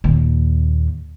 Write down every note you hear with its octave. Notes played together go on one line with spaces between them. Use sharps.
D#2 A#2